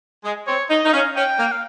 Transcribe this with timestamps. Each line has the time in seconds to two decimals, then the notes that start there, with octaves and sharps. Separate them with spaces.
0.25 G#3
0.47 C4 C#5
0.70 D#4 D#5
0.84 D#4
0.89 D#5
0.93 C#4 F5
1.16 C#4 G5
1.39 A#3
1.52 F5